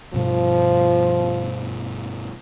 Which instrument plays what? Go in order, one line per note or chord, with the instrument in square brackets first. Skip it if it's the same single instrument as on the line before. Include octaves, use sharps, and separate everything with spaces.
[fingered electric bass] G2 B2 G3 [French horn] F3